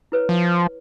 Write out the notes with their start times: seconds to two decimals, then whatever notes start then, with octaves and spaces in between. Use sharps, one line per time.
0.12 E4 B4 C#5
0.29 F3